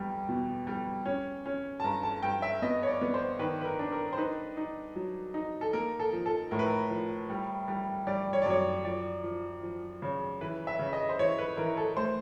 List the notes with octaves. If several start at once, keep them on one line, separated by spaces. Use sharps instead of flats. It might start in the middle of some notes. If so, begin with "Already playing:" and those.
Already playing: E2 G3
B2
G3
C#4
C#4
A5
G2 A#5
A5
G2 G5
E5
B3 D#5
C#5
D5
B3
C5
D#3 B4
B4
A#4
D4
A#4
C5
D#4 B4
D#4
F#3
D#4
A4
A#3 A#4
A4
F3
A4
A2 A#4
B4
A#4
F3
G3
G3
G3 D5
C#5
D5
F#2 C#5
F3 D5
F3
F3
C#3
E3 B4
E5
C#3
D#5
C5
E3 C#5
B4
E3 A#4
A4
A3 C5